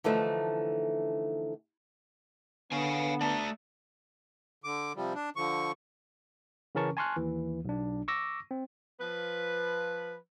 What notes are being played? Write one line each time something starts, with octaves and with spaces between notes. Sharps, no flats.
D3 E3 F3 A3 D#4
D3 B3 C#5 F5 G#5
A3 D5 A5 A#5
D3 D6
C3 F3 G3
D4
D3 F3 C#6
C#3 E3 C#4 A#4 A5 C#6
G#5 A5 C6 C#6 F6 F#6
D#2 E3
B1 D4
C#6 D6 E6 A#6
C4
F3 B4